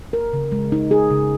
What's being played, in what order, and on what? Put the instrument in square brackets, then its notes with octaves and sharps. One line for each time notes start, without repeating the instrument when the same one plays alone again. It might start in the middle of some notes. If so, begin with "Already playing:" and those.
[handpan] A#4
C#3
G#3
D#4
G#4
C#3